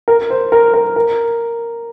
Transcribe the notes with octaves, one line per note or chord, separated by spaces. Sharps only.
A#4
C5
A#4
A#4
A#4